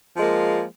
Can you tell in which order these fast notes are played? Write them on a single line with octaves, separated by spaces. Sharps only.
F3 G#3 A#3